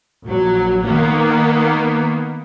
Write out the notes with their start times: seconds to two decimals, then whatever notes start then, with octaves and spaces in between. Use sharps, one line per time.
0.25 A#1 F#3
0.84 D#3 A#3 B3